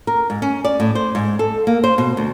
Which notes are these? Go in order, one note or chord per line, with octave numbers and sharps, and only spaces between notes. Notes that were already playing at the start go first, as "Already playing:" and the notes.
A#4
G#2
C#4
D5
A2
C5
G#2
A4
A#3
C5
B2
D2